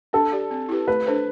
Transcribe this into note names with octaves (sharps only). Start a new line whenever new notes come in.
D4 A4
G4 D5
C4
E4 G4 B4
A3 B4
D4 A4 C5